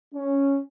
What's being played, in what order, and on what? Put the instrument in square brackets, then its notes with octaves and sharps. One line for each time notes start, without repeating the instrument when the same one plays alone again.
[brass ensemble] C#4